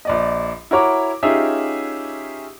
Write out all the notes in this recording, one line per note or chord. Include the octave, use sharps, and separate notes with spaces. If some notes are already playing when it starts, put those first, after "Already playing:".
A#1 D5 D#5
E4 F#4 A#4 C#5 D6
C#4 D#4 F4 G4 G#4 E5